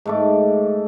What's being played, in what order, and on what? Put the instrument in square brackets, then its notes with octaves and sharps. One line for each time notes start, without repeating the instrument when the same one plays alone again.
[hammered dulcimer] G#2 A3 D6